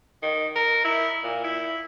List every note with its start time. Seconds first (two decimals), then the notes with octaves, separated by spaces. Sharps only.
0.22 D#3
0.55 A#4
0.84 E4
1.23 A#2
1.44 E4